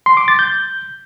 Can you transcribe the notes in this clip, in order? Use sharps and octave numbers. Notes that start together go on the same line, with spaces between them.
C6
D6
A6
G6